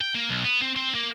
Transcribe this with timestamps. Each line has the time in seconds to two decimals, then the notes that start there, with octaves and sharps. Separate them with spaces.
0.01 G5
0.15 A#3
0.29 B1
0.44 B3
0.61 C4
0.76 C4
0.95 A#3